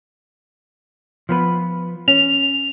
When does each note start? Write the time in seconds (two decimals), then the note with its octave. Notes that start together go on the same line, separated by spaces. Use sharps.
1.29 F3 B3 B4
2.08 C#4 F7